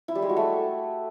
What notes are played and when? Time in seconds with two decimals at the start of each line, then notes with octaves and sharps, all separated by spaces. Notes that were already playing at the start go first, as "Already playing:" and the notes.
0.08 E4
0.15 G3
0.22 G#3
0.29 F#4
0.37 A3